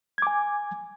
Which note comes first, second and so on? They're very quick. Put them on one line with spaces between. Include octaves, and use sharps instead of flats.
G#6 D6 G#5